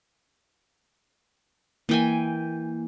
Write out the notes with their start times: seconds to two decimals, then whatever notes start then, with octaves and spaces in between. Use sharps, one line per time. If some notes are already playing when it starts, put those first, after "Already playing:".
1.89 E3 A#3 G5 G#5